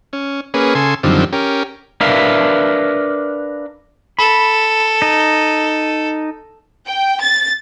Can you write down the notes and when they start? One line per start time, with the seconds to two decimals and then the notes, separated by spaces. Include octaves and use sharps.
0.13 C#4
0.54 A#3 C#4 G#4 B4
0.75 C#3 A4 G#5 C6
1.03 F#2 D3 D#3 F3 G3 C4
1.33 C#4 G4 A#4
2.01 D4 A#4 B4 E5 F5
4.19 A4 B5
5.02 D#4
6.88 G5
7.21 A6